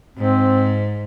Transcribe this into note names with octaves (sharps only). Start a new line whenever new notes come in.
G#2 C4